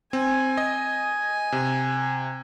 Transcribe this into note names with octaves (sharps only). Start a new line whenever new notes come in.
C4 G#5
D#5
C3